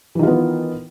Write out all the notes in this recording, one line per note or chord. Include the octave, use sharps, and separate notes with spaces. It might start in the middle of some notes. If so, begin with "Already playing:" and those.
D#3 E3 B3 F4